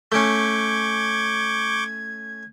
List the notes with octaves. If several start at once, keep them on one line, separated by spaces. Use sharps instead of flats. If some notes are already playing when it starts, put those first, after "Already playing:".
A3 C#4 C#6 D6 G6 G#6